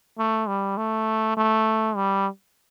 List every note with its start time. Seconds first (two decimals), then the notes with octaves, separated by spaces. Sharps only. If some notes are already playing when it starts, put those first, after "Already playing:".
0.18 A3
0.48 G3
0.77 A3
1.37 A3
1.96 G3